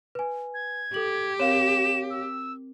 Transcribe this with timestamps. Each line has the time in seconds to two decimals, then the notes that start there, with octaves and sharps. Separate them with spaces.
0.15 B4 G#5
0.54 G#6
0.94 G4 A4 F#7
1.40 C4 A#4 C#5 F5 E7
2.10 E6